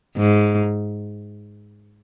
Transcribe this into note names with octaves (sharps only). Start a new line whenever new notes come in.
G#2